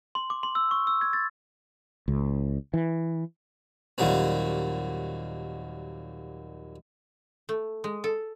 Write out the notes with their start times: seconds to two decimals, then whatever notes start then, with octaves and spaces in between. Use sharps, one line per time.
0.15 C6
0.30 D6
0.43 C6
0.55 E6
0.71 C#6
0.87 E6
1.01 G#6
1.13 A6
2.08 C#2
2.74 E3
3.98 D#2 A#2 F#3 G3 C4
7.49 A3
7.84 G#3
8.04 A4